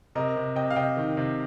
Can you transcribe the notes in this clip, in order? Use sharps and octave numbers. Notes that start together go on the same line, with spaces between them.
C3 A#4 D#5
C3
C3 D#5 G5
F5
C3 D#5 G5
D#3
C3